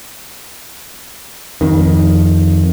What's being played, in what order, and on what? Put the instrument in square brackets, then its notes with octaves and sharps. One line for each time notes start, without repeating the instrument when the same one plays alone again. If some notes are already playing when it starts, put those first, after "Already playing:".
[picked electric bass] F2 D#3